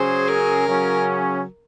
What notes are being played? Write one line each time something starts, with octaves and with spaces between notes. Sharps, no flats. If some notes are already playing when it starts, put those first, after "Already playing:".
Already playing: C#3 F#3 C#4 G#4 C5
A#4
C#3 F#3 C#4